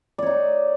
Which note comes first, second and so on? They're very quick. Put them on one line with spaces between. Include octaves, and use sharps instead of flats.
D5 C#5 D#4